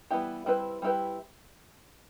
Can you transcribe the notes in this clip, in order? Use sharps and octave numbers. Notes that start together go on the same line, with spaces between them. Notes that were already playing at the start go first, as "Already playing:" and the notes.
E3 G3 B3 E4 G4
G3 C4 E4 G4 B4
G3 C4 E4 G4 B4